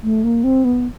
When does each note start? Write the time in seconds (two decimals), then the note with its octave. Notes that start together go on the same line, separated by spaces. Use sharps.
0.03 A3
0.24 A#3
0.44 C4
0.65 B3